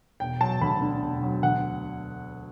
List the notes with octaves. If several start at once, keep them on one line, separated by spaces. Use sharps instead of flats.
E1 G5
F#3 A5
D2 B5
D3
E1
F#3
D2 F#5